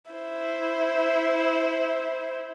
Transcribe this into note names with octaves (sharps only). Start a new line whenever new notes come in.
E4 C5